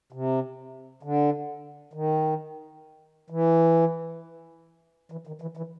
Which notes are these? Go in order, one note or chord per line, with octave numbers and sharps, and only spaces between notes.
C3
D3
D#3
E3
E3
D#3
E3
E3